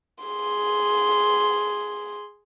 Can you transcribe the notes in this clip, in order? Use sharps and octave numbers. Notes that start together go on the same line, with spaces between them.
G#4 C6